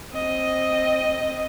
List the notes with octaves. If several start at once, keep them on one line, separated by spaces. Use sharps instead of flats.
C4 D#5